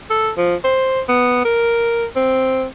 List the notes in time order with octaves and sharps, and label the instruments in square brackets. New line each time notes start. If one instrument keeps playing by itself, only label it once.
[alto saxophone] A4
F3
C5
B3
A#4
C4